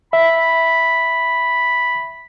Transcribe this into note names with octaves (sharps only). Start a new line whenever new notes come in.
E5 B5